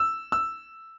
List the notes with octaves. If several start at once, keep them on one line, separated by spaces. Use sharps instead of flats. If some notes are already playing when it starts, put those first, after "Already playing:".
Already playing: E6
E6